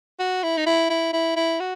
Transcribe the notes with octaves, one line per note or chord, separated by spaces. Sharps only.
F#4
E4
D#4
E4
E4
E4
E4
F#4